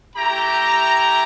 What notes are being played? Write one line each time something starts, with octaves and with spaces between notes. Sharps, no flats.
A3 E4 G4 G5 A#5